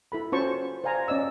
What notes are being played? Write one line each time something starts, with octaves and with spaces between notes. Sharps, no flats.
E4 A4 B5
C#4 F4 F#4 C5 A5 C#6
C5 D5 F5 G#5 A#5
C#4 D5 D#5 E6